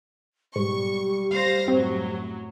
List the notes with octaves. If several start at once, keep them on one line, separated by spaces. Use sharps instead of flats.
B1 G#2 G3 C#6
C5 F5 A#6
F#2 A2 F#3 C4